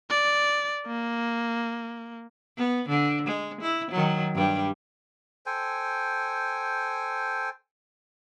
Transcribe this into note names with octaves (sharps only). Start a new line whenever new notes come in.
D5
A#3
B3
D3
G#3
E4
D#3 F#3
G2 G3
A4 C5 G5 G#5